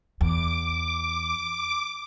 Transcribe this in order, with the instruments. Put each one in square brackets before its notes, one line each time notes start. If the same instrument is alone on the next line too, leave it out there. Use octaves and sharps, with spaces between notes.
[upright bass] E2 [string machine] D6